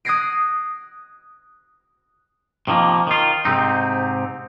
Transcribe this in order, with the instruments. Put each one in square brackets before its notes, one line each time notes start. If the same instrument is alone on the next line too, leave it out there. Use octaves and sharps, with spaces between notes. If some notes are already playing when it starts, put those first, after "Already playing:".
[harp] D#6 F#6 G#6 A#6 C7 D7
[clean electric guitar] C3 D#3 F3 A#3
D#3 F4
G#2 C3 C4 D#4